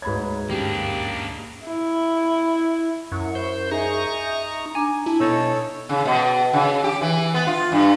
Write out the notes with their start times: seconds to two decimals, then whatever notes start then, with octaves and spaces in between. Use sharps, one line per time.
0.02 D2 G#2 B4 C#5 B5 G#6
0.50 D2 G2 A#3 C#4 D4 G4
1.65 E4
3.12 F#2 E4 C#6
3.35 C5 G6
3.71 D#4 G#4 E5 A#5 C#6
4.75 D4 G#5 A#5 D6
5.06 E4 A5
5.20 B2 D#4 A4 C#5 E6
5.89 C#3
6.05 B2
6.53 C#3
6.84 G4
7.02 E3
7.34 B3
7.47 F4
7.72 G2